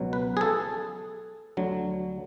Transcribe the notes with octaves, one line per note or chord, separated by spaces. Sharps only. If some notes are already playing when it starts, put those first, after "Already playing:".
Already playing: C#2 B2 F#3
B4
G#4
A4
D2 D3 F#3